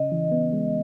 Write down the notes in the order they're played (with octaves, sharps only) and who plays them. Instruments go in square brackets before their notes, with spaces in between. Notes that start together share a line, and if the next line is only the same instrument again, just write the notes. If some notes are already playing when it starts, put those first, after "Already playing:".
Already playing: [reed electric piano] C#3 C#4 [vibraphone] D#5
[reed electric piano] E3
B3
G#3